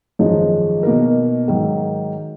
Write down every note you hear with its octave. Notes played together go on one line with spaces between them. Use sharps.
G#1 F#2 F3 G#3 D#4
B2 A#3 D#4 A#4
G#2 D#3 F#3